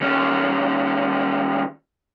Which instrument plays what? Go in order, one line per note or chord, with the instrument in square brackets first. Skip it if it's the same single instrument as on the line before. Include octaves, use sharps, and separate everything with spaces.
[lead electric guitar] D#2 C#4